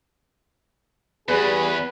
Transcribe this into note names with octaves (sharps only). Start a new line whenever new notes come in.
E2 G3 B3 G#4 B4